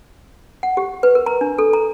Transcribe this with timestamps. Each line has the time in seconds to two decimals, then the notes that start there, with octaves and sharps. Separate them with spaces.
0.63 F#5
0.77 G4
1.03 B4
1.15 A#4
1.26 A#5
1.41 D4
1.58 A4
1.73 A#5